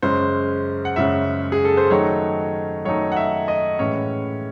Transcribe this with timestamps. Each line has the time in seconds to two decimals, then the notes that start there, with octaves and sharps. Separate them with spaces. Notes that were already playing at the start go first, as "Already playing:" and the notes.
0.02 F#2 C#3 G#3 C#4 C5
0.85 F#5
0.96 F#2 C#3 G#3 C#4 E5
1.52 G#4
1.65 A4
1.77 C5
1.91 D#3 F#3 A3 D#4 C#5
2.85 D#3 F#3 A3 D#4 C#5
3.12 F#5
3.16 E5
3.48 D#5
3.79 A2 E3 G#3 C#4 C#5